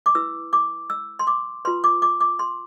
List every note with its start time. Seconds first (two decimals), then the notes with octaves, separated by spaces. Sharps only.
0.06 D6
0.15 E4 B4 E6
0.53 D6
0.90 E6
1.19 C6
1.27 D6
1.65 F4 B4 C6
1.84 D6
2.02 D6
2.21 D6
2.39 C6